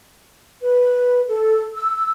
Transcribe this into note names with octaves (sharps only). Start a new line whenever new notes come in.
B4
A4
E6